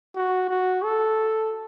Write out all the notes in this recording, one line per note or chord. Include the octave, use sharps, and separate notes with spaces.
F#4
F#4
A4